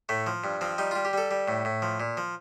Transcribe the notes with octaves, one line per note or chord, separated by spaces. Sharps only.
A2 A3
F3
G2
F3 C4
G3 D#4
G3 F4
G4
G3 A4
G3
A2
A2
F3
A#2
F3